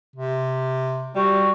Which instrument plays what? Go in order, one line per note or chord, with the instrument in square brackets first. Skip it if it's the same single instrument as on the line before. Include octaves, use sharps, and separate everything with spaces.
[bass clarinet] C3
[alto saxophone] G3 [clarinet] F#4